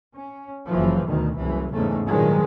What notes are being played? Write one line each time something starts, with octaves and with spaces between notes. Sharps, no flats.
C#4
F#1 E3 F3
D2 B2 D#3
F#1 C2 E3
E2 G#2 C#3 A3
G2 A#2 D#3 F3 F#3 G#3